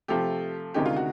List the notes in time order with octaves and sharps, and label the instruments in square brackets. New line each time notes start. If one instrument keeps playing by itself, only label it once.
[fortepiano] C3 F3 A3 [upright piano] G4
[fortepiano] D2 C3 D#3 G#3 C#4 [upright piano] G4
[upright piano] F4
F#4